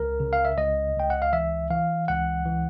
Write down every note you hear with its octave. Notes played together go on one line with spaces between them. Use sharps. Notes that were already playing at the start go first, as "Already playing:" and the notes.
Already playing: C#2 A#4
C#3
F5
E5
C#2 D#5
C#2 G5
F#5
F5
E3 E5
E3 F5
C#2 F#5
E3